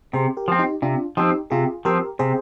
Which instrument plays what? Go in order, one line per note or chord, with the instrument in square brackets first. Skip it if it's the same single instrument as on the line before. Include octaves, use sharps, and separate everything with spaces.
[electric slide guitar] C3 [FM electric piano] G#4 C5
[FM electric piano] G4 A#4
[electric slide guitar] F3 C4
[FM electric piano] D#4 G4
[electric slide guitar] C3 [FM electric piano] D4 F4
[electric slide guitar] F3 C4 [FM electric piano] D#4 G4
[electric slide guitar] C3 [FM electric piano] F4 G#4
[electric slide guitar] F3 C4 [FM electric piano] G4 A#4
[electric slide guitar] C3 [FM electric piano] G#4 C5